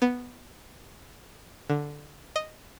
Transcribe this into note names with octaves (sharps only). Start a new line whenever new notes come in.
B3
D3
D#5